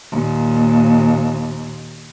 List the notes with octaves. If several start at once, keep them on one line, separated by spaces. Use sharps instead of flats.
D#2 A#2